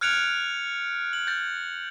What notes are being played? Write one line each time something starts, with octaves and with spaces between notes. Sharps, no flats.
F6 F#6 G#6 C#7 D7 F7
F#7
G6 A6